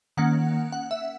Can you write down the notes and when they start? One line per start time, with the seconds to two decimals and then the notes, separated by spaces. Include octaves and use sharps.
0.17 D#3 A#3 C#4 F#5
0.72 F#5
0.91 E5